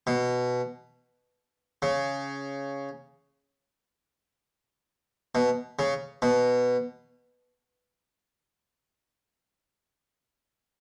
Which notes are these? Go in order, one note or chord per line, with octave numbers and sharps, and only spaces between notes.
B2
C#3
B2
C#3
B2